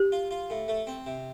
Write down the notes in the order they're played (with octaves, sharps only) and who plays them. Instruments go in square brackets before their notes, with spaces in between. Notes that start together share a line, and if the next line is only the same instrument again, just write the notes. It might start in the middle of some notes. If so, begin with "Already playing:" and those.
Already playing: [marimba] G4
[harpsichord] F4
F4
A2
A3
C4
C3